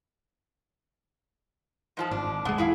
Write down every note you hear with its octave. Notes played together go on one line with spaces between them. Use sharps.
G#2 F3 A5
G#1 D4
E1 G#3 B3
E4 G#4 F5